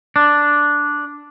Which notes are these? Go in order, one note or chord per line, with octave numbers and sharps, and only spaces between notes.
D4